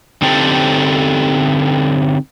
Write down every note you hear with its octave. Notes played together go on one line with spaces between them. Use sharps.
D3 C4 D#4 G4 A4